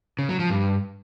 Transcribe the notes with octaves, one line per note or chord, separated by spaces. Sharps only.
C#3
F#3
F3
G2